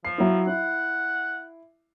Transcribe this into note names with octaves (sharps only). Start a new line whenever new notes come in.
F3 C7
F#3 E4
E4 F#5